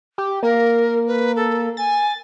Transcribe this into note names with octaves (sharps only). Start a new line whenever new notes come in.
G4
A#3 A#4
B4
A4
G#5 A6